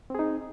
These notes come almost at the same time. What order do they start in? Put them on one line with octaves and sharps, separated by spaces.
C4 G#4 D#4